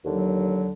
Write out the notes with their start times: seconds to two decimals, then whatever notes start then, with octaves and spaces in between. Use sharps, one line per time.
0.04 D#2 D3 F#3